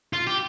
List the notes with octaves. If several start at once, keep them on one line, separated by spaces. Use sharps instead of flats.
F4
G4